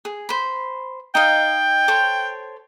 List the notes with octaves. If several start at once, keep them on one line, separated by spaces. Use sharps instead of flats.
G#4
C5 B5
D#4 D#5 F5 G5
A4 C5 C#5